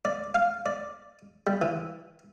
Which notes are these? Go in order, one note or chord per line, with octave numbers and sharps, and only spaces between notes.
D5
F5
D5
G3
E3